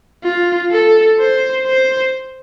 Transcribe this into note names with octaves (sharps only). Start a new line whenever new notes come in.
F4
A4
C5
C5